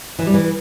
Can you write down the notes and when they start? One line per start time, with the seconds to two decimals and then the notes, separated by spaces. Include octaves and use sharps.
0.19 E3
0.26 G3
0.34 E3